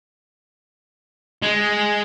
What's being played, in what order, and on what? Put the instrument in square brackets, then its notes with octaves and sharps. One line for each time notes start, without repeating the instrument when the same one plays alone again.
[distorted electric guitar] G#3